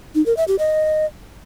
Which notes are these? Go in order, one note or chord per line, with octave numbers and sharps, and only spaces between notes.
D#4
A#4
E5
G4
D#5